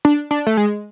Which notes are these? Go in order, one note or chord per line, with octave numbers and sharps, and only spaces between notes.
D4
D4
A3
G#3